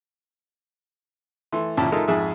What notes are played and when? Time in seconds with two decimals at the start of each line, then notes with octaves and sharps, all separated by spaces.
1.53 E3 A3 C6
1.77 A1 A#2 C#3 E4 E5 A5
1.92 G#3 D#4 F4 A4 A#4 E5
2.08 F2 G#2 G#4 E5